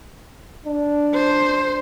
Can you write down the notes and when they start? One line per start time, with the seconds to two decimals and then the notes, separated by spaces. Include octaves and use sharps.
0.66 D4
1.14 C5